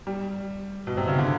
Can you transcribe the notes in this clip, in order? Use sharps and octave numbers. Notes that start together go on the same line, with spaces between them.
G3
B2
C3
C#3
D3